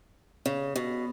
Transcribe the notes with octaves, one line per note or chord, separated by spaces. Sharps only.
C#3
B2